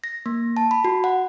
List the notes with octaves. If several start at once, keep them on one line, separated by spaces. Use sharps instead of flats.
A#6
A#3
A5
B5
F#4
F#5